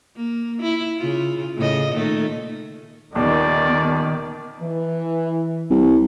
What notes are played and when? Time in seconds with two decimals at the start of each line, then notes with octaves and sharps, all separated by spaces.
0.16 A#3
0.62 E4
0.97 C#3 F4
1.57 A2 C#3 D#5
1.93 A#2 D#3 A3
3.15 D#1 D#3 B3 D5
4.61 E3
5.70 C2